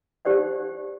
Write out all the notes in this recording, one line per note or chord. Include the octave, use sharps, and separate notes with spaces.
D#4 G4 C5 D5 F#5